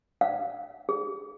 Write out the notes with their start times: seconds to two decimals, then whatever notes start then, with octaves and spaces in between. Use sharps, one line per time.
0.21 F5
0.89 G#4